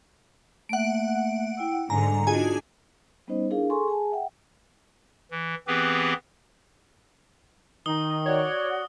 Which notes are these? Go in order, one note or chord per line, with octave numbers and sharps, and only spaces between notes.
A3 A#3 E5 F#5 D7
E4 G5 E6
G#2 D3 G3 G#5 A#5
D4 D#4 F4 F#4 G#4 G#5
G3 B3 C#4 D#4 C5 D#5
D4 E4 G#4 A#4 F5
G#4 A4 G#5 C6 C#6
G#4 G#5 A5
E5 F#5 G5
E3
E3 B3 C4 G4 G#4 B4
D#3 D#4 D#6 G7
F#4 C#5 D5